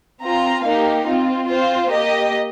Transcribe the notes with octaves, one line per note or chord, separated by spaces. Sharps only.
C4 F4 A#5
A#3 D#4 G4 F5
C4 F4
C4 F4 C5
A#3 G4 D#5